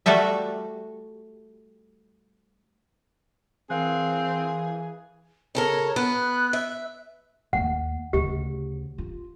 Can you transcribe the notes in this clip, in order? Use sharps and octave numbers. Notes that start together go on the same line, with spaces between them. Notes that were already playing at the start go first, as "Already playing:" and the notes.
G3 A3 F#4 A4 E5
E3 C4 G#4 A#4 F5 F#6
C#3 A4 A#4 C#5
B3 F#6
E5
D#2 A#3 F#5
D2 C#3 G4
F4